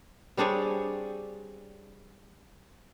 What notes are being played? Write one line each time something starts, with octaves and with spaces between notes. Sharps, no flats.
G3 C4 D4 G#4 C#5